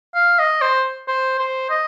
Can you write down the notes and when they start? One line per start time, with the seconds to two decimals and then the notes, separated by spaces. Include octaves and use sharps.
0.15 F5
0.39 D#5
0.61 C5
1.08 C5
1.39 C5
1.70 D#5